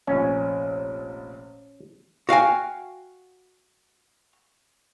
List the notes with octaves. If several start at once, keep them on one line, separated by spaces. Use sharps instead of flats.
F1 A#1 C#4
F#4 F5 G5 G#5